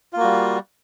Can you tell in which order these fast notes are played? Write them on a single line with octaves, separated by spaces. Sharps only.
F4 A#3 F#4 G3